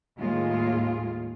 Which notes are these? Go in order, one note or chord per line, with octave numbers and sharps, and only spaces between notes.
D#2 A2 G#3 F4 G#4